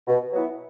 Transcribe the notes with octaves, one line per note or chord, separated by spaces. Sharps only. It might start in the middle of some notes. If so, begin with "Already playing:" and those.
B2
F#3 B3 E4